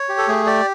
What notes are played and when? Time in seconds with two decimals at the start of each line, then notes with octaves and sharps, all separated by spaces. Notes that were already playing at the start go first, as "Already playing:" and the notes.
Already playing: C#5
0.09 G4
0.18 A4
0.28 A3 G#4
0.46 G4 D5